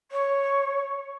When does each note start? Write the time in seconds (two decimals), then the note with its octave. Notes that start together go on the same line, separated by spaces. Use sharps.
0.11 C#5